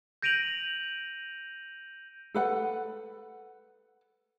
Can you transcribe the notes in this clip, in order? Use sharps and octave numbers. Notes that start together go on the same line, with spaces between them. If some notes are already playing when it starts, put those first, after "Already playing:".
G6 A#6 D7 D#7 F7 F#7
A4 B4 F#5